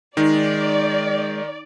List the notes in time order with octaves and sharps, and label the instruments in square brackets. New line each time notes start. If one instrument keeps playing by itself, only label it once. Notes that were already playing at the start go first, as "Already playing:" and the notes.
[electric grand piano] D#3 [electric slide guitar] G#3 [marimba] D#4 [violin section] D5